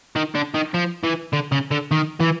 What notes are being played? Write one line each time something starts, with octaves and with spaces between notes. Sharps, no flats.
D#3
D3
D#3
F3
E3
D3
C#3
D3
D#3
E3